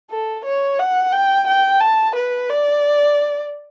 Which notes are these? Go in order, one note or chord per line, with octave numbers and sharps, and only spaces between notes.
A4
C#5
F#5
G5
G5
A5
B4
D5